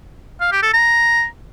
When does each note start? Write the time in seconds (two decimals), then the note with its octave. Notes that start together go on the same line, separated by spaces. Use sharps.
0.41 F5
0.52 G4
0.62 A4
0.73 A#5